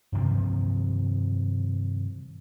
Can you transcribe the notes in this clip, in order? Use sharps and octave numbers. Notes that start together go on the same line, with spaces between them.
G2 C3 D#3 F3